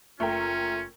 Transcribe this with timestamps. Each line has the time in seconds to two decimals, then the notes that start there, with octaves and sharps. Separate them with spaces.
0.20 F#1 A3 C#4 F4 A#4 G5